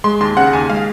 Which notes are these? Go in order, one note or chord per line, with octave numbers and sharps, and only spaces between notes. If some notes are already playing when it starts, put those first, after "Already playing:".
G#3 C6
D#2 C6
C#3 F#5
D#2 G#5
G#3 F5